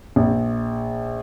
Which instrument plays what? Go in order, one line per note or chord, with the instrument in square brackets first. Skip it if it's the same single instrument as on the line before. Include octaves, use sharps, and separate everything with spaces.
[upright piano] A#1